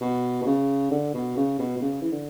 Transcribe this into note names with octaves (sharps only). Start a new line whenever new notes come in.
B2
B2
C#3
D3
B2
C#3
B2
B2
C#3
E3
D3